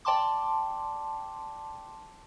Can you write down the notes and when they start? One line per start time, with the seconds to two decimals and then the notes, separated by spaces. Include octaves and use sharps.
0.05 D5 G5 A5 C6 D6